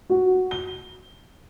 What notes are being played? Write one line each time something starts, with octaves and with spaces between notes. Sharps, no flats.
F#4
G7